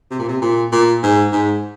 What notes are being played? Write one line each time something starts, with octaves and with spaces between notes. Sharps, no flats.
C3
A#2
C3
A#2
A#2
G#2
G#2